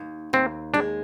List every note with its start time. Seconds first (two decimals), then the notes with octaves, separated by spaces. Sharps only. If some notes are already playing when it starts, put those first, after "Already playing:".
Already playing: D#2
0.33 D#2 C4
0.74 G#3 D4